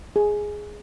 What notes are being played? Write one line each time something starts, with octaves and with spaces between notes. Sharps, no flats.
G#4